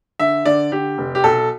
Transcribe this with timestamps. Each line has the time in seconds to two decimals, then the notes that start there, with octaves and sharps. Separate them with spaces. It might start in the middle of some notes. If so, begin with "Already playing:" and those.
0.19 D3 E5
0.46 D3 D5
0.72 D3 G4
0.98 F1
1.15 G4
1.24 B1 A4